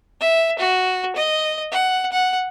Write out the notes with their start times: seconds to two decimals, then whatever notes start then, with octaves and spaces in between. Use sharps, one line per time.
0.20 E5
0.59 F#4
1.16 D#5
1.71 F#5
2.12 F#5